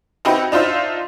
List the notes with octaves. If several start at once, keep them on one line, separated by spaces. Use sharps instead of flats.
C4 D#4 E4 F#4 G4 B4
D4 D#4 F4 C5 E5